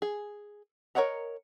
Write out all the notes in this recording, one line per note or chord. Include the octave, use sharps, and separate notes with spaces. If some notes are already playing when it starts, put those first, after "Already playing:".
G#4
A#4 C#5 D#5 F#5 A#5